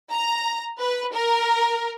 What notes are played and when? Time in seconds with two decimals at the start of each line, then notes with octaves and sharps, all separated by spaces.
0.11 A#5
0.80 B4
1.14 A#4